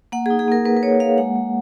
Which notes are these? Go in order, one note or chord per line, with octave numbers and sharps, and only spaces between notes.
A#3 F#5
G#4
D#4
G#4
A#3 A#4
A#3 B4
B4
A#3 C#5
A#3 F5
G#3 F#5
G#3